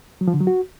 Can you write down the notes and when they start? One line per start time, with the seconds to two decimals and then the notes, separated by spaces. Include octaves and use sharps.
0.21 F#3
0.28 F3
0.34 D3
0.41 F#3
0.47 F#4